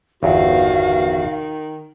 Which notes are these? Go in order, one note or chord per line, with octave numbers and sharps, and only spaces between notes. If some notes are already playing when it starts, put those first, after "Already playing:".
G1 E2 D#3 F#4 F5